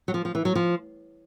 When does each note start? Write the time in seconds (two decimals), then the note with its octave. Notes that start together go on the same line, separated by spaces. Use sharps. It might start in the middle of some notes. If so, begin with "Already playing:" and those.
0.08 F#3
0.14 F3
0.25 F3
0.35 E3
0.45 F#3
0.55 F3